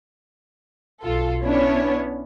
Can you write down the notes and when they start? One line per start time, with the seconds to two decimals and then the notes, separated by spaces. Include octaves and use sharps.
1.03 B1 F4 A4
1.44 B3 C#4 D4 E4 C#5